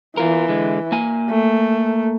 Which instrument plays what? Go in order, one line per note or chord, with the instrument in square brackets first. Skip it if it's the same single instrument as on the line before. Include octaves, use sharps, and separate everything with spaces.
[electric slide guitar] E2 F4 A#4 [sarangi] E3
[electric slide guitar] D3 G#3
A#3 G#5
[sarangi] A3